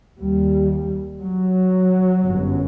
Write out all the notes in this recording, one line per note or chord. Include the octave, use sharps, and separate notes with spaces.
D#2 G3
F#3
G1 F#2